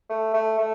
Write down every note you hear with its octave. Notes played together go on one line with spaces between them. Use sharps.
A3
A3
A3